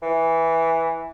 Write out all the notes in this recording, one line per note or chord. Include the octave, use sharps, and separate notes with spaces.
E3